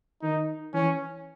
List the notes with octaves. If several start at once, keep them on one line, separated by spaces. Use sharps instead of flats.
D#3 D#4
E3 C#4